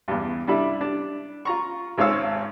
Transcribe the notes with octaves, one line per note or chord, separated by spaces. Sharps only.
E2 G2
G3 D4 E4
D4
F4 A#5 C#6
G#1 G#2 C#5 F5 E6